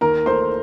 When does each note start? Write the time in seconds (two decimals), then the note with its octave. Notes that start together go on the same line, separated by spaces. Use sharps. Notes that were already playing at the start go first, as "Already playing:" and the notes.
0.01 D#2 A#4 A#5
0.26 A3 C5 C6